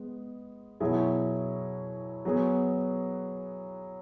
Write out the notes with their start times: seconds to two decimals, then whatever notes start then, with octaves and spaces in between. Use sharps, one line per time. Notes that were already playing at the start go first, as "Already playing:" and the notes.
Already playing: G#3 B3
0.80 B2 F#3 E4 G#4
2.25 F#3 B3 G#4